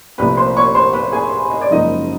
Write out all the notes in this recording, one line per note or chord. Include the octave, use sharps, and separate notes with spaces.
C2 A#2 F3 A3 B4 B5
C5 C6
C#5 C#6
C5 C6
B4 B5
G#4 G#5
D#5
D5
F#1 F#2 C#3 F3 G#3 D#4 D#5